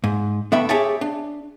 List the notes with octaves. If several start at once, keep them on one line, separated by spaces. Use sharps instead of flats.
G#2
D3 A3 B3 E5 G5 B5
G4 G#4 C#5 E5 G5 A5
D4